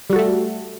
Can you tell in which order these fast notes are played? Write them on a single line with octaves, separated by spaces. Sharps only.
G3 F#4 A4 A3